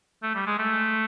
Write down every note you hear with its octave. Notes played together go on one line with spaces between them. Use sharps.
A3
G3
G#3
A3